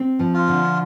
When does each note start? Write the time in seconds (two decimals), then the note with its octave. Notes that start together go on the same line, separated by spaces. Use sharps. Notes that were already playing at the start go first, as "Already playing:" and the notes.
Already playing: C4
0.19 F3
0.34 F4
0.48 D3